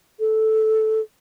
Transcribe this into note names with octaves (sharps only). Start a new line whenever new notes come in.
A4